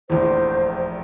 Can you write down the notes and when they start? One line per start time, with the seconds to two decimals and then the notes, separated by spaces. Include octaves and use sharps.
0.10 F1 A#1 E2 C5